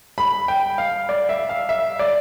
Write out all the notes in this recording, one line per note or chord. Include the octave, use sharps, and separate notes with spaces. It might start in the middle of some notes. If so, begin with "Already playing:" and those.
B5
G5
F5
D5
E5
F5
E5
D5